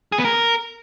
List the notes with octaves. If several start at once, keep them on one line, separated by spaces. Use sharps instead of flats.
G#4
B3
A#4